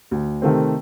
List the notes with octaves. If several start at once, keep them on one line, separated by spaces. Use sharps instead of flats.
D2
C3 D#3 A3 C4